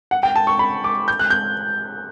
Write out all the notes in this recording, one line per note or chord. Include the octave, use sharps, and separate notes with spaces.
F#5
G5
A5
C#6
B5
D6
G6
F#6
G6